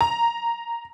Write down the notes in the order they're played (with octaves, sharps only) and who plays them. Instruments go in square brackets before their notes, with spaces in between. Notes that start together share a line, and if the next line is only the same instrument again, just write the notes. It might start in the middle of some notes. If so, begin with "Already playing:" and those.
[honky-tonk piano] A#5